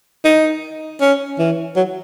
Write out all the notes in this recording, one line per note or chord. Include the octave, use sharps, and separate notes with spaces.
D#4
C#4
E3
F#3